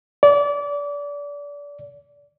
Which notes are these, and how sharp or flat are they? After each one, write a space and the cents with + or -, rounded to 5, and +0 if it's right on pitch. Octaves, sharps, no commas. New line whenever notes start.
D5 -30